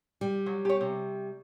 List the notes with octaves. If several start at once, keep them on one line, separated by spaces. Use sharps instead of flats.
G3
F#3
G4 C#5
C3